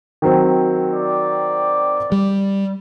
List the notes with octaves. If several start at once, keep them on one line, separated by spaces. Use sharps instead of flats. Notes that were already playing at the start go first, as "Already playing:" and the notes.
D#3 F#3 C4
D5
G3